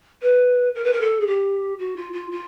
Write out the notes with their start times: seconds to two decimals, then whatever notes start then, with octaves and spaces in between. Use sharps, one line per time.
0.22 B4
0.75 A#4
0.84 B4
0.93 A#4
1.01 A4
1.20 G#4
1.27 G4
1.79 F#4
1.97 F4
2.13 F4
2.31 F4